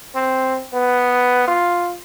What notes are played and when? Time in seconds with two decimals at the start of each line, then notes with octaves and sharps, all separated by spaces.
0.15 C4
0.73 B3
1.48 F4